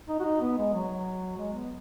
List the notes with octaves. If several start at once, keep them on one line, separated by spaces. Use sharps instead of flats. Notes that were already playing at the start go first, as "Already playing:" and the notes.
D#4
F#4
D#4
B3
G#3
F#3
G#3
B3